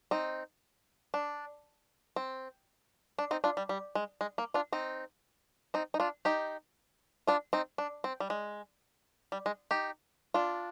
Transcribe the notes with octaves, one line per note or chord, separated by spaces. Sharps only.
C4 D#4
D4
C4
D4
C4 D#4
D4 F4
G3
G3
G#3
G#3
A#3
D4 F4
C4 D#4
C4 D#4
D#4
D4 F4
D#4 G4
D4 F4
C4 D#4
D4
C4
G3
G#3
G3
G#3
D#4 G4
D4 F4